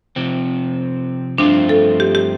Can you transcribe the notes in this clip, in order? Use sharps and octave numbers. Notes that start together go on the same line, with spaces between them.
C3 F3 C4
G2 F3 A3 C4 D4 F4
A4
G4
G4